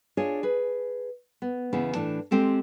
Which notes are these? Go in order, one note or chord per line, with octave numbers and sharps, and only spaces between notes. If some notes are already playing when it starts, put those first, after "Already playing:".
D4 F4 G#4 C#5 D#5
G#4 B4
B3
E2 C#3 B3 E4
A2 E3 D4 A5
G#3 C4 G4 A4